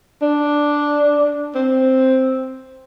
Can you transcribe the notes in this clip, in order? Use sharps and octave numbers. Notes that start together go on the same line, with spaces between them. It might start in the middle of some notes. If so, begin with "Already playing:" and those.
D4
C4